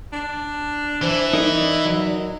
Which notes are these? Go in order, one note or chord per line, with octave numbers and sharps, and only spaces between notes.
D4
E3 E4 C5
D#4 A#4 D5 D#5
F#3